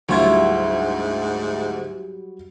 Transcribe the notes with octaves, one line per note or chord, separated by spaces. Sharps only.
D2 G#2 F#3 G3 E4 F4 C#5 G#6